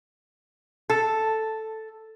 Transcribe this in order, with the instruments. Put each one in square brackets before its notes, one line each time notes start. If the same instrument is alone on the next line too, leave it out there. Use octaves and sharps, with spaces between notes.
[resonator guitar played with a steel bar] A4